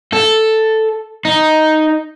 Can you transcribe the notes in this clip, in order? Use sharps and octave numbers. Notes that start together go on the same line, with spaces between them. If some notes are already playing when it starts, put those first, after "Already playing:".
A4
D#4